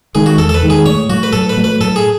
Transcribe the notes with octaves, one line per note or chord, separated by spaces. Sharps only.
D#3 G#3 G#4
F#4
E2 A4
A4
B4
D#3 G#3
G#4
A2 C#5
F#3 A3 F#4
B4
A2 A4
B4
F#3 A3
B4
A2 A4
G#4